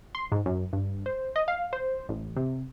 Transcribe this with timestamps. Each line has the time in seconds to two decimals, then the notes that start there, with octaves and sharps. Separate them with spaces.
0.15 C6
0.32 G#2
0.46 F#2
0.73 G2
1.06 C5
1.36 D#5
1.48 F5
1.73 C5
2.09 A1
2.37 C3